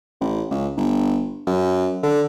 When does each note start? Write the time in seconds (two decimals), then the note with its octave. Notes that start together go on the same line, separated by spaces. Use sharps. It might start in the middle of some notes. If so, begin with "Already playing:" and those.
0.21 A1
0.50 C#2
0.77 G1
1.47 F#2
2.03 D3